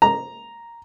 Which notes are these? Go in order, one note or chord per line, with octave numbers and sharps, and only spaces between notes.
A#5